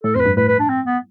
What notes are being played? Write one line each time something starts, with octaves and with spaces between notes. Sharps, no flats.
A2 A4
F2 B4 C5
G2
A2 B4
B4
D4
C4
B3